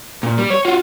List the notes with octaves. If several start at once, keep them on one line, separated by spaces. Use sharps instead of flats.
A#2
G3
C#5
F4 F#4